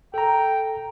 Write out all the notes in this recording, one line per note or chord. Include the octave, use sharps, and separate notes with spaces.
A4 G5 A#5